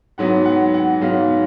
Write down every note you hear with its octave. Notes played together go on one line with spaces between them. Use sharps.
G#2 F#3 B3 F#5
F#5
F#5
G#2 F#3 B3 F5